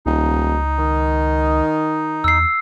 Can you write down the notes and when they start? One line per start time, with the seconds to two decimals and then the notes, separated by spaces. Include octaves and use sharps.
0.06 D#1 C#2 D#4
0.79 D#3
2.24 E2 E6 C7